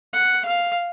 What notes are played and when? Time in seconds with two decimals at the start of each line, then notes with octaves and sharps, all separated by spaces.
0.13 F#5
0.45 F5